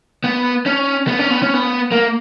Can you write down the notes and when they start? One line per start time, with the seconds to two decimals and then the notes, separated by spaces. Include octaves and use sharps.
0.24 B3
0.66 C#4
1.07 B3
1.19 C#4
1.30 B3
1.42 C#4
1.54 B3
1.91 A#3